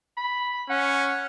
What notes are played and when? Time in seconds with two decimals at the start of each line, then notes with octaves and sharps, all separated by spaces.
0.17 B5
0.70 C#4 F#5